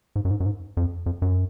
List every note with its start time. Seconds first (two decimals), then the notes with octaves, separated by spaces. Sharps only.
0.16 G#2
0.25 F#2
0.31 G#2
0.40 F#2
0.46 G#2
0.77 F2
1.06 F2
1.22 F#2